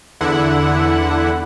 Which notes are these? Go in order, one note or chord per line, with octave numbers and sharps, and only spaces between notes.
E2 D3 E4 F#5